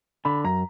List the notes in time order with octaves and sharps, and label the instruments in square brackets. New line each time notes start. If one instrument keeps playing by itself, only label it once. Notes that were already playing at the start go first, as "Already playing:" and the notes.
[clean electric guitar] D3 [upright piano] B5
[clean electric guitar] F#2 [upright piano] A#5